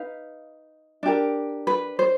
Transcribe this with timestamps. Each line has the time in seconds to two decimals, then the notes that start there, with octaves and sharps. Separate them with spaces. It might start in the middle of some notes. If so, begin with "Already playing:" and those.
Already playing: D#4 B4 F5
1.03 D4 G4 A#4
1.67 B4
1.99 C5